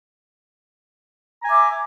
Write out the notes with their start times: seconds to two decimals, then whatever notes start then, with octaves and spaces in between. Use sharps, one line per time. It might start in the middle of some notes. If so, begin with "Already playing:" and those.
1.41 A#5
1.44 G#5
1.47 E5
1.50 D6